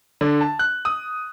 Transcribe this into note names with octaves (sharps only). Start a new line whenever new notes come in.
D3
A5
F#6
D#6